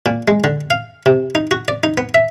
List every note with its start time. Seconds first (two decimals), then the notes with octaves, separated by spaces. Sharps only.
0.06 A#2
0.28 G#3
0.44 D3
0.70 F5
1.06 C3
1.35 D#4
1.51 F#4
1.68 D5
1.83 D#4
1.98 B3
2.14 E5